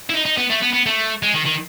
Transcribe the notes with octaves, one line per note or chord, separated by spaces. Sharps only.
E4
D#4
D#4
B3
A3
B3
B3
A3
G#3
D#3
D#3